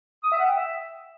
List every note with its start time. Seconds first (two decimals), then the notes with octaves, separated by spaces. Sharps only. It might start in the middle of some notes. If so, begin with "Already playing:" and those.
0.24 D#6
0.31 E5
0.39 F#5
0.47 G5
0.55 E5